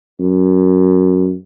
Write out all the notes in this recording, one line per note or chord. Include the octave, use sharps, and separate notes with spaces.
F#2